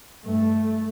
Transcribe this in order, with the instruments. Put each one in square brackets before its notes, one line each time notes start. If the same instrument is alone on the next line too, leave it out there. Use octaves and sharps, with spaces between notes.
[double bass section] G2 A3